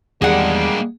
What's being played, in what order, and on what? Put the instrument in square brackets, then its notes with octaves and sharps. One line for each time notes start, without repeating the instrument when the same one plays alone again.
[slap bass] E2 D#3 [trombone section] G3 G#3 [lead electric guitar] A#3 D4 [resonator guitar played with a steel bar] G#4 F#5